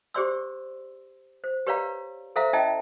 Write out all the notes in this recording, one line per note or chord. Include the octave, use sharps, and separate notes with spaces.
G4 G#4 C5 D5 C6 E6
C5
G4 B4 C#5 D5 F5 A#5
A4 C5 E5 F5 A#5
C#4 E4 D#5 E5 G5 A5